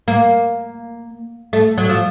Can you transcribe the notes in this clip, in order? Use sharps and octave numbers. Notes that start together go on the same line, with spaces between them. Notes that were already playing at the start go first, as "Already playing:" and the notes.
A#3
A3
F#3
F3